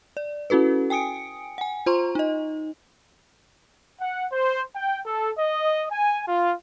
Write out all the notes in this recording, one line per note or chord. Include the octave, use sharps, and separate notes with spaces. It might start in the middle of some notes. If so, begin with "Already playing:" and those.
D5
C#4 E4 F#4 A4 B4
G5 G#5 D#6 C#7 D7
F#5 G#5
F4 C5 A#5 C6 C#6
D#4 D#5
F#5
C5
G5
A4
D#5
G#5
F4